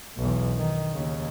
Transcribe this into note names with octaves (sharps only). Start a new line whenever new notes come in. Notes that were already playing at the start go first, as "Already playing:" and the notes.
B1 E2
D#3
D#2 C#3